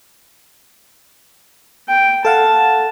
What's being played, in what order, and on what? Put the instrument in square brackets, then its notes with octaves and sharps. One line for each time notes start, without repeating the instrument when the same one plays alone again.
[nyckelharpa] G5
[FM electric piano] A4 F5 F#5 [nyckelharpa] A5